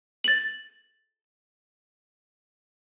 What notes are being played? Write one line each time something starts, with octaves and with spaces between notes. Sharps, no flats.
A6 F#7